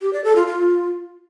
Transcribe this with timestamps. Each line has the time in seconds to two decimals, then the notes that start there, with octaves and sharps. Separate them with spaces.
0.02 G4
0.13 D5
0.24 A4
0.36 F4
0.47 F4